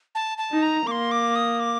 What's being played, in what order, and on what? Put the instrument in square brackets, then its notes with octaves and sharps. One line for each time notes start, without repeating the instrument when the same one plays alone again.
[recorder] A5
A5
[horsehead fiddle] D#4
[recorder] A#5
[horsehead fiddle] A#3 [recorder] D6
[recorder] C6
D6
D#6
D6